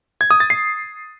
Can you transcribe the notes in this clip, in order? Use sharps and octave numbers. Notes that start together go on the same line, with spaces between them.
G#6
D#6
A6
C7